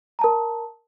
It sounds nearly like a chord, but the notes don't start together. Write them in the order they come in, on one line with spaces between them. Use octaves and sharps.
A#5 A5 A#4